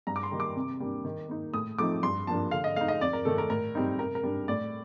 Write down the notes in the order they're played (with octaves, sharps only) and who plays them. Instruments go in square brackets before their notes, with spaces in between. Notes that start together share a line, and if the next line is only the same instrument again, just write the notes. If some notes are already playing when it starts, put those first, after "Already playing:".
[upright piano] G2 A#5
D6
C6
D#3 G3 A#3
D6
C3
G3 A#3 D4
D#3
A#3 D#4
A2 D#6
F3 A3 C4 D#4 D6
G2 C6
F3 A#3 D4 A5
D3 F5
D#5
A3 F5
D#4
D#5
F2 D5
A#4
D#3 A3 A4
A#4
A2 A#4
G3 C4 D#4
C3 A#4
A#4
G3 D4
A2 D5